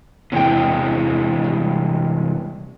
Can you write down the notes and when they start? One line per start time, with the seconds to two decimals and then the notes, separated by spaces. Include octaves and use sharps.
0.32 E2 C3 E3 G#3 G5
1.44 G3